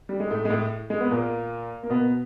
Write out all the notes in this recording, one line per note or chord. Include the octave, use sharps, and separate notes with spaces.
G3
G#3
A2 A3
G#3
A2 A3
G#3
B3
A#2 A#3
A#3
B2 B3